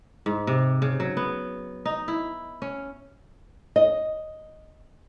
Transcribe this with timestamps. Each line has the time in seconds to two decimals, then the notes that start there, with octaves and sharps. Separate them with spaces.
0.26 G#2
0.47 C3
0.82 C#3
1.00 F#3
1.17 B3
1.85 D#4
2.08 E4
2.62 C#4
3.76 D#5